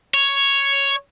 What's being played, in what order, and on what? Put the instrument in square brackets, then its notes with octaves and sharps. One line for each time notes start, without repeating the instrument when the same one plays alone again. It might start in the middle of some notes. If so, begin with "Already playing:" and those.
[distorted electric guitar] C#5